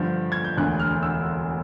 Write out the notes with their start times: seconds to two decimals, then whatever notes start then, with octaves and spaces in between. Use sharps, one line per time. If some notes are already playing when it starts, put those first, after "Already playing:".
Already playing: G2 D3 F3 G6
0.32 G#6
0.44 G6
0.57 E1 D2 D3 F#6
0.79 F6
1.03 E6